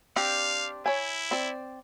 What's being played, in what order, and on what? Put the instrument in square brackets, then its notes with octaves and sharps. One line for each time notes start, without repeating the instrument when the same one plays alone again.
[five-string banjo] C4 D4 G4 [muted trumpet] F5
[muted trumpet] E4 [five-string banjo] C#5 G#5
[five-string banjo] C4 D5